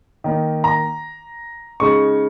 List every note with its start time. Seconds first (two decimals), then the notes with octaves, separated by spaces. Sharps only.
0.24 D#3 A#3 D#4
0.64 A#5
1.80 C#3 G#3 D#4 C#6